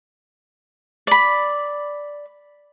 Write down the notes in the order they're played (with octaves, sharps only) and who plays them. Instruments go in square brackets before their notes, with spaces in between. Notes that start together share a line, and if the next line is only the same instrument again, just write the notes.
[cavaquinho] D5 B5